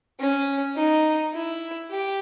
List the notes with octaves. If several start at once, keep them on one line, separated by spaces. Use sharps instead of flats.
C#4
D#4
E4
G4